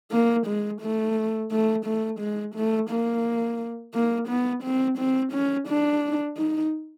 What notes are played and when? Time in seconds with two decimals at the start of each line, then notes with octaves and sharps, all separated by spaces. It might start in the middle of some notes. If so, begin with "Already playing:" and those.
0.12 A#3
0.47 G#3
0.82 A3
1.51 A3
1.85 A3
2.20 G#3
2.55 A3
2.90 A#3
3.94 A#3
4.28 B3
4.63 C4
4.98 C4
5.32 C#4
5.68 D4
6.37 D#4